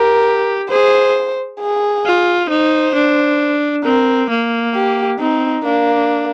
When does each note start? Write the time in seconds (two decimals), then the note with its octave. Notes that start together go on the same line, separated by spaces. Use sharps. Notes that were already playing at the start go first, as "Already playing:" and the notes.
Already playing: G4 A#4
0.70 G#4 C5
1.60 G#4
2.05 F4
2.50 D#4 C5
2.95 D4
3.84 C4 A#4
4.30 A#3
4.75 G4
5.19 C4 D#4
5.64 A#3 D4